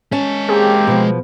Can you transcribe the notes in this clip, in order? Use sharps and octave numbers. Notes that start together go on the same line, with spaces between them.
G#3 C#4 A5
A#3 C4 G4 G#4
B2 F3